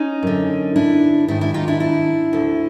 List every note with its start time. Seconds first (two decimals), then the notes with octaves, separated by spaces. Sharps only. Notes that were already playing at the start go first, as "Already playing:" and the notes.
Already playing: C#4 D#4
0.23 F#2 D3
0.76 D4 E4
1.28 G#2 D#3 D4 E4
1.41 D4 E4
1.54 D#4 F4
1.68 D4 E4
1.80 D4 E4
2.33 D2 D3